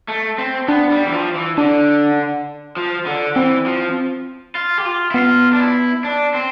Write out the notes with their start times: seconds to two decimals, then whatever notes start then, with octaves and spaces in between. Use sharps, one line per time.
0.08 A3
0.38 C4
0.68 B3 D4
0.90 G3
1.06 E3
1.13 F3
1.35 E3
1.58 D3 D4
2.77 F3
3.06 D3
3.36 E3 C4
3.66 F3
4.55 F4
4.78 G4
4.85 F4
5.11 E4
5.14 B3 F4
5.53 D4
5.60 E4
6.04 D4
6.34 C4